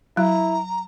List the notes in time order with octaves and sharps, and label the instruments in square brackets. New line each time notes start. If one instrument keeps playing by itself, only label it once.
[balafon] F#3 [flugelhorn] E4 [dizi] A#5